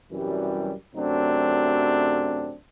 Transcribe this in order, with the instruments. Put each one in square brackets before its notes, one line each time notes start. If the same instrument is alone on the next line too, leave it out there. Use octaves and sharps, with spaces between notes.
[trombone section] F#2 C3 E3 F#3 G3
F#2 C3 F#3 A3 C4 D4